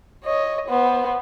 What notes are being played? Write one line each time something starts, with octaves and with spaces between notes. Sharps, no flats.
C#5 D#5
B3 C5